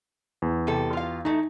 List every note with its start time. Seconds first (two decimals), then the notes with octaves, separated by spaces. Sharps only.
0.42 E2
0.67 C3 G3 A4
0.93 F4 F5
1.25 E3 A3 D#4